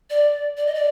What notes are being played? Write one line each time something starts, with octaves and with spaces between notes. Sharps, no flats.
D5
D5
D#5
D5